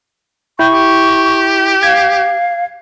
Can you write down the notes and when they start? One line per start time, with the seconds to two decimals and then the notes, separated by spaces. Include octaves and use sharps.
0.59 E4 G5 C#6
0.72 G4
1.83 F5 G#6